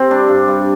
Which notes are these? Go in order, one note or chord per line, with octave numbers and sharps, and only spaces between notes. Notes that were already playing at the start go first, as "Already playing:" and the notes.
Already playing: C3 C4
G3 D4
G2
G2